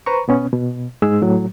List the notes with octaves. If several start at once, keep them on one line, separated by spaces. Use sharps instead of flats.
B4 C5 A#5 C#6
B2 B3 C#4
B2
G#2 G#3 G#4 E6
A2 F#3